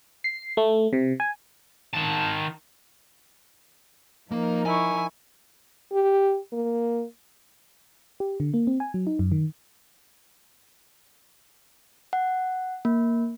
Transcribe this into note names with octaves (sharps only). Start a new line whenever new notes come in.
C7
A3
C3
G#5
D#3 A5
F3 A#3 D#4 A#4
E4 G#5 C#6
G4
A#3
G4
D3
A#3
C4
G#5
F#3
D#4
F#2
D#3
F#5
A#3